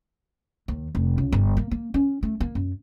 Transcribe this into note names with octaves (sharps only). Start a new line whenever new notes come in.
D#2
F1
C#2
G1
A#3
A#3
C#4
A3
A#3
F#2